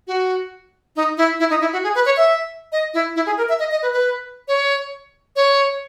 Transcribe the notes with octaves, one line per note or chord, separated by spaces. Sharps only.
F#4
D#4
E4
E4
D#4
E4
F#4
G#4
B4
C#5
E5
D#5
E4
E4
G#4
A#4
E5
D#5
D#5
B4
B4
C#5
C#5